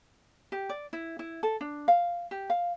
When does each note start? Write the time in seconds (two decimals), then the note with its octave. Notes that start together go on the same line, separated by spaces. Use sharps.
0.52 G4
0.69 D5
0.93 E4
1.19 E4
1.43 A4
1.61 D4
1.88 F5
2.31 G4
2.50 F5